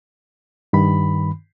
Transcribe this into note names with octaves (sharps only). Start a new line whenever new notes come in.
G2 D#3 B5